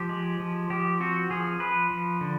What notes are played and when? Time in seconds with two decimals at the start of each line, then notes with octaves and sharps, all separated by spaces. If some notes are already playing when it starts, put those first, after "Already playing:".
Already playing: F3 G4
0.09 G#3
0.40 F3
0.70 F3 G4
1.00 C4 F#4
1.30 F3 G#4
1.60 F3 B4
1.90 F3
2.21 D3